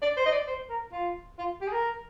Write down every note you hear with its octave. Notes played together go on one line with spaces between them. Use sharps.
D5
C5
D#5
D5
C5
A#4
F4
F4
G4
G#4
A#4